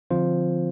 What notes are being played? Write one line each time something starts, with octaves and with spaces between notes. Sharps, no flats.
D3 F3 C4 F4 C5